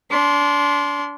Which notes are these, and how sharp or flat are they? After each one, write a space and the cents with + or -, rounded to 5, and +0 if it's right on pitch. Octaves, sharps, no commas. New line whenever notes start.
D4 -30 C6 +0